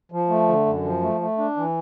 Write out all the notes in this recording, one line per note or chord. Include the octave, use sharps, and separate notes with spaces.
F3
A3
D3
F#2
F3
A3
A3
D4
E3